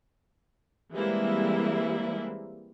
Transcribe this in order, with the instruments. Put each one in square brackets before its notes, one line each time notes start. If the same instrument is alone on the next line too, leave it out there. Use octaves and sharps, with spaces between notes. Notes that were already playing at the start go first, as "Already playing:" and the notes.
[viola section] E3 G3 G#3 A#3 C4 E4